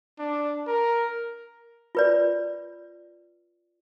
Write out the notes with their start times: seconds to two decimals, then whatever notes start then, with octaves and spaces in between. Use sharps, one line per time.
0.19 D4
0.67 A#4
1.95 F4 B4 D5